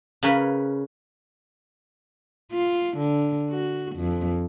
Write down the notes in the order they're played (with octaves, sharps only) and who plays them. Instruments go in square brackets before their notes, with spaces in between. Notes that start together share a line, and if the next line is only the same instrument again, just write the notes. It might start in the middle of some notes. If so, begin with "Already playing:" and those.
[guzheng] C#3 C#4 A#4 B4
[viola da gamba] F4
D3
F#4
F2